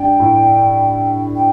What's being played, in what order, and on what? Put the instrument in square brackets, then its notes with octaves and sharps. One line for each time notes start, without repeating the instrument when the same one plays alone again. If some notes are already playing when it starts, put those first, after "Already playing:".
Already playing: [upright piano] G2 [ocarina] G5
[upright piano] A2
[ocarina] G5